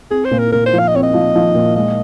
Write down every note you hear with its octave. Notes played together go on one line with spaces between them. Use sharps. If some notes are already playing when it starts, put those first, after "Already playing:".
C4 G#4
C5
A#2
A#4
A#2 A#4
C5
F3
F5
D#5
C4 C#5
D#5
F3
F3
A#2
G#3 D#5